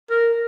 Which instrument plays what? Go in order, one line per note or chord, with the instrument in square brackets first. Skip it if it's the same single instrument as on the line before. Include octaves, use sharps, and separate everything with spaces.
[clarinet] A#4